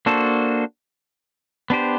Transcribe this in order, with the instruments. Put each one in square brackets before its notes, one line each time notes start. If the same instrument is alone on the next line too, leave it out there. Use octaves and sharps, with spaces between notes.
[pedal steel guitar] A#3 D4 F#4 A4 C5
B3 D4 G4 C5